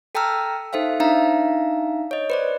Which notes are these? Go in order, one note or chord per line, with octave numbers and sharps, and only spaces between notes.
A4 G5 A5 A#5 E6 F6
D#4 A4 C5 E5 F5
D4 D#4 E5 F5 A#5
C#5 D#5
B4 C5 D5